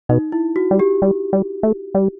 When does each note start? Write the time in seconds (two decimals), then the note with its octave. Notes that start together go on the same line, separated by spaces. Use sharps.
0.09 B2 D#4
0.32 E4
0.56 F#4
0.71 G3
0.79 G4
1.02 G3
1.33 G3
1.63 A3
1.95 G3